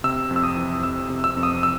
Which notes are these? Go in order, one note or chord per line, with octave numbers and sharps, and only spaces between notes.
C3 E6
F2
E6
D#6
E3
F2 E6
C3
E6
F2
D#6
E6